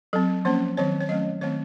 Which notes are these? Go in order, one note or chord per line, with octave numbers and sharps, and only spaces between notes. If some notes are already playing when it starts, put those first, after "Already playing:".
F#3 C4 A4
F3 A#3 C#4 C5
D#3 F#3 C4 C#5
C#5
F#3 A3 C#4 D#5
D#3 A3 C4 C#5